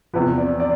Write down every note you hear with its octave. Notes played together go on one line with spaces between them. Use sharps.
E2 C3 F3 B4
D5
D5